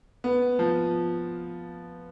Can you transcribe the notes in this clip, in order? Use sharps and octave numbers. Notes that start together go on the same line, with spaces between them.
B3
F3